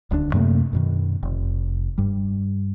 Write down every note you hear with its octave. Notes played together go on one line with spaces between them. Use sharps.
D#1 D2 G3 D4
F#2 C3 A3 A#3
F#2 B2 D#3
F1
G2 G3